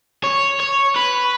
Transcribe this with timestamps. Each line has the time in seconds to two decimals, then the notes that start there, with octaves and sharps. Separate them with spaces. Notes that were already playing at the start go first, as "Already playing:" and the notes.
0.23 C#5
0.60 C#5
0.96 B4